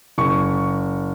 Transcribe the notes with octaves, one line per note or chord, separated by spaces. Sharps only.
F#1 C#6